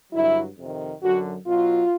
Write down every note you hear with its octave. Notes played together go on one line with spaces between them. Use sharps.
G2 D3 F#3 E4
F2 C3 D#3
F#2 D3 F#3 F#4
B2 F#3 F4